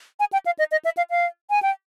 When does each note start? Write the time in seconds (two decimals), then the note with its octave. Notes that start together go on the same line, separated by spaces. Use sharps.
0.20 G#5
0.33 G5
0.46 F5
0.59 D#5
0.71 D#5
0.85 E5
0.97 F5
1.10 F5
1.50 G#5
1.63 G5